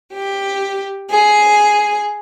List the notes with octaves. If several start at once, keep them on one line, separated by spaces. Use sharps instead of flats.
G4
G#4